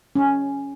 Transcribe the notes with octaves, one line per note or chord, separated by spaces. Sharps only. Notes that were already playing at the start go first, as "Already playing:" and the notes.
C#4